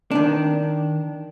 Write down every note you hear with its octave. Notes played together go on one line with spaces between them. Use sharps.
D#3 D4